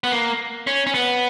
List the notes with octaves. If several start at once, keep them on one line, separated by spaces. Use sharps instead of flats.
B3
A#3
C#4
C#4
B3